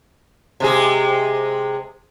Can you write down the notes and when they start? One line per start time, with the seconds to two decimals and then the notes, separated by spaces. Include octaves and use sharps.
0.60 C3 G#3 G#4